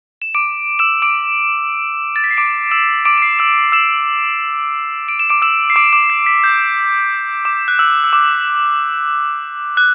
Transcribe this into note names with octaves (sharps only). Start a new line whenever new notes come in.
E7
D6 D7
E6 E7
D6 D7
A6
B6
C7
D6 D7
E6 E7
D6 D7
D7
C7
E6 E7
E6 E7
D7
E7
D6 D7
E6 E7
C7
D6 D7
D6 D7
C7
B6
G6
D6
F#6
E6
E6
D6
F#6